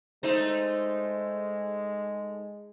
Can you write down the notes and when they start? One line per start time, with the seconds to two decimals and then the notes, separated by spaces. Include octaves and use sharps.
0.23 G#3 A3 D#4 C5